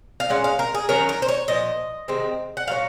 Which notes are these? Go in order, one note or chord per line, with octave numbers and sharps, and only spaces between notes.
F5
A#2 G#3 C#4 F#5
F5
A#4
G#4
D#3 F#3 C#4 A#4
A#4
C5
C#5
A#2 F3 D#5
C3 D#3 G#3 C4
F#5
A#2 F#3 C#4 F5